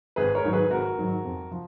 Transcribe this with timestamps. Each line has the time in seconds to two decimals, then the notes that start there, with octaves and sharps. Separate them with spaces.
0.16 G#1 G#4 B4
0.35 A#4 C#5
0.44 G#2 D#3 F#3
0.53 G#4 B4
0.70 G#1 F#4 A#4
0.98 G#2 D#3 F#3
1.25 F2
1.51 F3